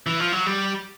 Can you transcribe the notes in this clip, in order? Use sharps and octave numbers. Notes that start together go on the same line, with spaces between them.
E3
F3
F#3
G3